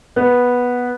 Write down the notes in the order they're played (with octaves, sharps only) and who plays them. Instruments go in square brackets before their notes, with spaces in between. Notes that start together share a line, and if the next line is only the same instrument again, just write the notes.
[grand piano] B3